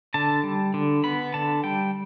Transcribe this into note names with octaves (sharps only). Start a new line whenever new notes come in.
D3 A5
G3
D3
B3 B5
D3 A5
G3 G5